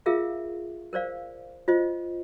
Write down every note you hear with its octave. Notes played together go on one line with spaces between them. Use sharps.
F4 G#4 A#4 E5 F5
A#4 C5 D5 F5
F4 C5 D#5